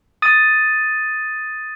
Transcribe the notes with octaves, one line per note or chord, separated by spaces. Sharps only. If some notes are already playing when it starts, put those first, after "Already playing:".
D#6 A6 D#7